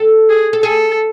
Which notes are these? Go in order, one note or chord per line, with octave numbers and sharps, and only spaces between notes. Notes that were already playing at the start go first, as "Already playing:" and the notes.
Already playing: A4
G#4
A4
G#4 A4